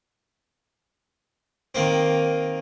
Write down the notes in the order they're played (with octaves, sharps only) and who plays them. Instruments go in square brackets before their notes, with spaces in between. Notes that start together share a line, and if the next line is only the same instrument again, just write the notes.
[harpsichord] D#3 A#3 C4